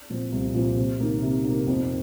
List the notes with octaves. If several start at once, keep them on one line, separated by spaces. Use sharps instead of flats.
A#2 F3 C4
C2
A#2 F3 C4
C3
D#3 A#3
C3
D#3 A#3
F2